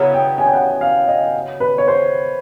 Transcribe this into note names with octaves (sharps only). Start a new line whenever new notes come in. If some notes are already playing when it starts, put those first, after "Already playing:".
Already playing: C#3 F#3 B3 E4 F#5
G5
G#5
G5
F#5
F5
D#5
B4
C#5
C5